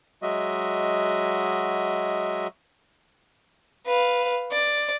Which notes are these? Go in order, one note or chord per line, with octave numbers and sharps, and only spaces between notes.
F#3 G#3 F#4 D#5 E5
B4 F5
D5